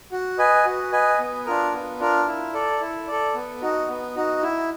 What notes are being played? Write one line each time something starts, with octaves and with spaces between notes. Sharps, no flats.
F#4
B4 D#5 G#5
F#4
B4 D#5 G#5
B3
D4 F4 A#4
B3
D4 F4 A#4
E4
A4 D5
E4
A4 D5
B3
D#4 F#4
B3
D#4 F#4
E4